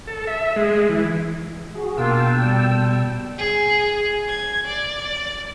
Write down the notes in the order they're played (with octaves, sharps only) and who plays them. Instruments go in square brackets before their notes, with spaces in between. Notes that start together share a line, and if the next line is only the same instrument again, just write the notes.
[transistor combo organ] A4
E5
G#3
E3
[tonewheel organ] F#4 G#4
[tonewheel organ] B2 G5 E6 [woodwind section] A#3 D4 F4
[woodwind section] G3 A4
[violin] G#4
G#6
D5